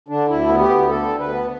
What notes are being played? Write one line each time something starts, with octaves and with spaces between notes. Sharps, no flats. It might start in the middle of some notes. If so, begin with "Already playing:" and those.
D3 D4
D2 E4
B3
G4
D2
D3 A4
D2
B4
B3